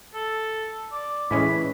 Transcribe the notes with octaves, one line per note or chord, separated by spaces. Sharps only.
A4
D5
A2 E3 G#3 C#4 B5